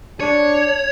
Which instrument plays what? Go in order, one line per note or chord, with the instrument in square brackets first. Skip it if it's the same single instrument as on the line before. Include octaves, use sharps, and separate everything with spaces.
[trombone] D4 [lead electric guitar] C#5